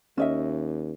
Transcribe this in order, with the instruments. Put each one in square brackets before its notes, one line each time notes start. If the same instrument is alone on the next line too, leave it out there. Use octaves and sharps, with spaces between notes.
[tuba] D#2 [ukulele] C#4 D#5 E5